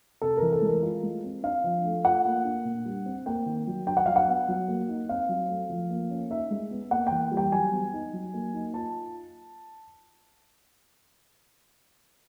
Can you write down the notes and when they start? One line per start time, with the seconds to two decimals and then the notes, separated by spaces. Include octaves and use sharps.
0.22 C3 A4
0.37 E3 A#4
0.53 A4
0.62 G#3
0.68 A#4
0.82 F4
1.03 G#3
1.23 C4
1.43 D4 F5
1.64 F3
1.84 A3
2.05 F4 F#5
2.25 A#3
2.44 D4
2.65 A#2
2.85 G3
3.06 C4
3.26 A#3 G5
3.46 D#3
3.67 F#3
3.87 D4 G5
3.97 F#5
4.06 F#3 F5
4.16 F#5
4.28 B3
4.48 F#3
4.68 A#3
4.88 D#4
5.09 C4 F5
5.29 F#3
5.49 A3
5.70 F3
5.90 A#3
6.10 C#4
6.31 D#4 E5
6.51 G#3
6.71 B3
6.91 A#3 F#5
7.07 E3 G5
7.32 G3
7.37 G5
7.52 F#3 G#5
7.72 B3
7.93 D#4
8.13 F#3
8.34 A#3
8.54 D#4
8.74 F4 A5